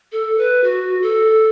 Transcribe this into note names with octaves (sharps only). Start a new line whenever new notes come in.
A4
B4
F#4
A4